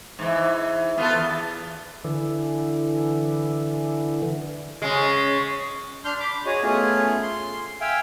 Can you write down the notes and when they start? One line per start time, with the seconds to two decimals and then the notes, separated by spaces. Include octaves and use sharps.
0.19 G#2 E3
0.98 B3 F4 A4
1.13 E2
2.04 D3 E3
4.82 C#3 G#3
6.05 D4 C6 F6 G6
6.20 B5 D6
6.46 F#4 G#4 C#5 D#5
6.62 A3 B3 C#4 F4 G#4
7.22 C6
7.81 E5 F5 G5 G#5